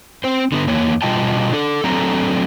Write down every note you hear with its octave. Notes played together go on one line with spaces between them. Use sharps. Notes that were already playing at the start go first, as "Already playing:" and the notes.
C4 C5
D3 B3
E2 A#3 C#5
B2 G3 F4 D#5 G5 A5
D4 A4
F#3 A3 C4 D4 A4 A#5